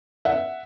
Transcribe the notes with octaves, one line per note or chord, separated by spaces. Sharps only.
E5 F#5